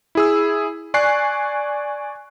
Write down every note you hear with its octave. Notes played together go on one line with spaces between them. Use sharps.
E4 G#4 E6
D5 G#5 C#6 F#6 C7